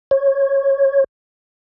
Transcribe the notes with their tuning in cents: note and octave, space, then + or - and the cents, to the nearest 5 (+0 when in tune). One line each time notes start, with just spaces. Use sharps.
C#5 -15